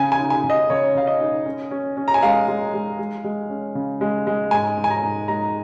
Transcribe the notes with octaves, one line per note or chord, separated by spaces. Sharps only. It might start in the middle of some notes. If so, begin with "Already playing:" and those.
Already playing: C#3 G#5
G#5
D#4
G#5
C#3
D#5
C#3 C#5
C#3 F5
D#5
D#4
C#4
C#4
C#4
A#5
G#5
G#3 F5
G#3
G#3
G#3
G#3
C#4
C#3
G#3
G#3
G#2 G#5
G#2
G#5
A#5
G#2
G#3 A#5